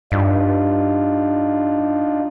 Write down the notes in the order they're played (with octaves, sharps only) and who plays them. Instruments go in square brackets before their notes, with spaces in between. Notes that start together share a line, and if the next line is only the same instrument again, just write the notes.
[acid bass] G2 [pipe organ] D4 D#4 F4